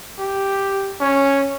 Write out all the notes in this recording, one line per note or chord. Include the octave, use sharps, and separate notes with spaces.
G4
C#4